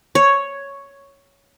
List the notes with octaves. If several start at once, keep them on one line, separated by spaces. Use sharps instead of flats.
C#5